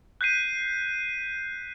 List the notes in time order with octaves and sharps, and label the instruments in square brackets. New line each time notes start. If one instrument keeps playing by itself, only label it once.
[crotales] F#6 G6 B6 C7 D#7